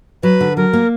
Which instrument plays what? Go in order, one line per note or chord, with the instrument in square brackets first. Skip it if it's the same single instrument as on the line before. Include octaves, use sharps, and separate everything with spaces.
[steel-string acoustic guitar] F#3 [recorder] B4
[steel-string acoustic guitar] D3
[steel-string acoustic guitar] F#3 [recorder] A#4
[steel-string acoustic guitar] A#3